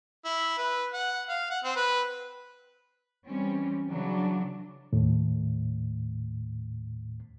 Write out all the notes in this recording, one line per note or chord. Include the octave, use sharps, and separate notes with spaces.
E4
B4
F#5
F5
F#5
C4
B4
E3 G3 C4 C#4
C#3 E3 F#3 D4
D#2 A2